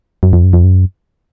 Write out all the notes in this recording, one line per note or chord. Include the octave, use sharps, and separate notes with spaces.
F#2
F2
F#2
F2
F#2